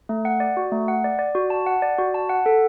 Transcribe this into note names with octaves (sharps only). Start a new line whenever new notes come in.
A3
F#5
D5
F#4
A3
F#5
D5
D5
F#4
A5
F#5
D5
F#4
A5
F#5
A4